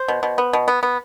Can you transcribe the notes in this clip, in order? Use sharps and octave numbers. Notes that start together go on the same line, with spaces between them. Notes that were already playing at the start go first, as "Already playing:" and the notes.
Already playing: C5
B2
B2
B3
B2
B3
B3